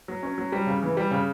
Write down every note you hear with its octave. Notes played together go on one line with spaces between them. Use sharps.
F#3
C#4
F#3
G3
C#3
E3
G3
C#3